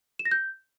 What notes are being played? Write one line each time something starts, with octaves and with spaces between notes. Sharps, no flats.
E7
A#6
G6